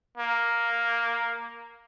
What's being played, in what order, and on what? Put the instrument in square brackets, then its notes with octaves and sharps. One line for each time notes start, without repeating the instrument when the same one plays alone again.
[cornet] A#3